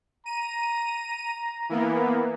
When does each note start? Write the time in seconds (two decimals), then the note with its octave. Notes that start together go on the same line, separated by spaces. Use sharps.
0.26 A#5 D#7
1.69 E3 A#3 B3